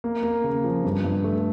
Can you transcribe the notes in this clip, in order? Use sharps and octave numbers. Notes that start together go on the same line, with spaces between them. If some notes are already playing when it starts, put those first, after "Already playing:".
A#3
A#3
C#3
F3
G2
G2
A3